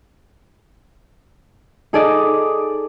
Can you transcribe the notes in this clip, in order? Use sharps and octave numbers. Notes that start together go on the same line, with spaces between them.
D#4 G#4 A4 D5 D#5